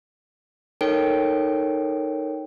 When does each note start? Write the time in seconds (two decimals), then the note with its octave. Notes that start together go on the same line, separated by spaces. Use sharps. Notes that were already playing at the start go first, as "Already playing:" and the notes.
0.81 D#4 A4 A#4 C#5 G5 D7